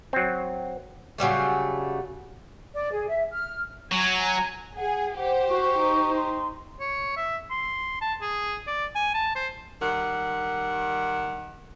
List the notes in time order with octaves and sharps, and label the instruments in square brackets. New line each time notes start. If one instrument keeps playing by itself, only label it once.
[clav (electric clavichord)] F#3 C4
[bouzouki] C#3 F#3 G3 A3
[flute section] D5
G#4
E5
F6
[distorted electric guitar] F#3 [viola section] G#5 A#5
[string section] G#4 [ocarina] F#5
[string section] G4 C5 [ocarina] F#5
[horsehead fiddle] F#4 [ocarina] C#6
[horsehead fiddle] D#4
[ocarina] C6
[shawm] C#5
E5
C6
A5
G#4
D5
G#5
A5
C5
[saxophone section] D#3 G3 F#5